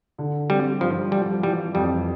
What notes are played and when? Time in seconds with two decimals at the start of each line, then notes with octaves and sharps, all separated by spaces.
0.18 D3
0.50 G3 C4
0.81 G2 F3
1.12 F3 G3
1.43 E3 G3
1.75 F2 G3